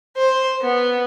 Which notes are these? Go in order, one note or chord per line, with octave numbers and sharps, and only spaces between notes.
C5
B3